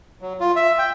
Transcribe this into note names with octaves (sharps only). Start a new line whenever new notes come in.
F#3
F4
E5
G5